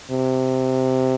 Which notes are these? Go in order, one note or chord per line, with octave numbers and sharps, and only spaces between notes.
C3